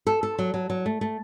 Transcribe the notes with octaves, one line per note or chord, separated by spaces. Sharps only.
A4
A4
F#3
F#3
F#3
A3
A3